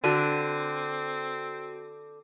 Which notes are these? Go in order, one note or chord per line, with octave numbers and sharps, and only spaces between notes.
D3 C4 D4 F#4 D#7